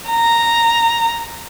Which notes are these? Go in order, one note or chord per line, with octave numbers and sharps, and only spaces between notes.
A#5